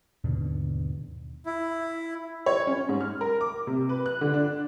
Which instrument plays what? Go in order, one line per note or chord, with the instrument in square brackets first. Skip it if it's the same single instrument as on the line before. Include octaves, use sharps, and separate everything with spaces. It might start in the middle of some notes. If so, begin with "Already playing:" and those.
[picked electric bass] D#2 G#2 B2 D3
[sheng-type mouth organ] E4
[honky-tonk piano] C#5
C#4
G#2
F6
A#4
D6
C3
B4
F#6
D3
D4